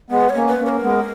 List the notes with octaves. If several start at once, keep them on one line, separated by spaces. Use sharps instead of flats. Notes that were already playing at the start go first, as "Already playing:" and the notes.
G#3 B3 B4
C#5
A#3 C#4
B4
A#3 C#4
B4
A#4
G#3 B3